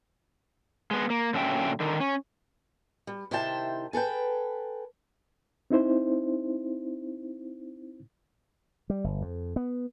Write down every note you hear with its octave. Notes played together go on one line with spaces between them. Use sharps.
G#3 B3
A#3
A#2 D3 F#3 C#4 E5 G5
D3 D#3
C#4
G3
C3 D#3 E4 C5 G5 A5
G#4 A4 B4 G5
C4 D#4 E4 C5
G3
G1
F2
B3